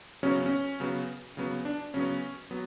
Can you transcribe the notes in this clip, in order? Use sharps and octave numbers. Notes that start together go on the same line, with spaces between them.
C#3 F#3 B3 C#4
C#4
C#3 F#3 B3
C#3 F#3 B3
D4
C#3 F#3 B3 C#4
F#3 B3